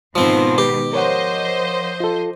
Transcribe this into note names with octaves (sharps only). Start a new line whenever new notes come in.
G#2 B2 D#3 F3 C4
G4 B4
F3 A#4 C5 C#5 D#5 F#5
F4 A4